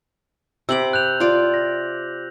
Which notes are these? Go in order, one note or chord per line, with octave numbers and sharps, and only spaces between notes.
C3 B5 D6 E6 F#7
F#6 G6 F7
F4 D5
A#6